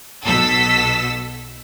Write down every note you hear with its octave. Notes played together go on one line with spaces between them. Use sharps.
B1 B2 A4 E6 B6